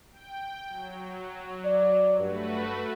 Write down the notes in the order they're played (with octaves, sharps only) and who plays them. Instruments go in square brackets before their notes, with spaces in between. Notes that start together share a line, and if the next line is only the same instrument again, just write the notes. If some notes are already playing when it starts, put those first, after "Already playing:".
[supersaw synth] G5
F#3
[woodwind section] D5
[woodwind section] G2 [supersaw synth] A3 F#4 B4